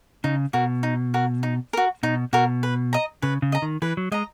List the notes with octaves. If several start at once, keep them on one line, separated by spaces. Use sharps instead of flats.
C#3 D#4
B2 F#4 A#4
D#4
F#4 A#4
D#4
F#4 A#4
B2 D#4
B2 F#4 A#4
B4
D#5 A#5
C#3 B4
C#3
D#5 A#5
D#3
E3 B4
F#3
G#3 D#5 A#5